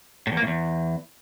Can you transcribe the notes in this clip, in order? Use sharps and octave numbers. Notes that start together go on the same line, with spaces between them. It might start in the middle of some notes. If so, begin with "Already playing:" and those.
A2
E2
A#3
A2
E2